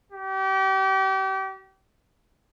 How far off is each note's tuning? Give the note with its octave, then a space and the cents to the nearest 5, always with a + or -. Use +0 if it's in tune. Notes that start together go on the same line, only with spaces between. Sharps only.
G4 -35